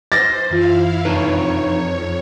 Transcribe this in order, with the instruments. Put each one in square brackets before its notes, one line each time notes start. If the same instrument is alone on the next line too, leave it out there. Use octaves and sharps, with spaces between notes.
[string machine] C5 [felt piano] A6 A#6
[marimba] F#2 E3 F4 [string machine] E4 F5
[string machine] F2 C#5 [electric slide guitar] D4 D#4 B4